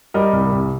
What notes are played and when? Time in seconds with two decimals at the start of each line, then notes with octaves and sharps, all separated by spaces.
0.14 G3 A#4 D#5
0.33 C2
0.52 C2